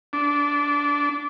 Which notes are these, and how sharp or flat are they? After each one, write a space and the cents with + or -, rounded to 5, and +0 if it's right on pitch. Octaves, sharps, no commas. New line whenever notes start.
D4 -20